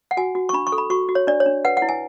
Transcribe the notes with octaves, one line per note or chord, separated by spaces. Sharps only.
F#5
F#4 G#5
F#4
C#6
D4 B5
C#6
A4
B5
F#4 C#6
F#4
C#5
D4 D5
C#5
D4
B4 F#5
F#5
E4
G#5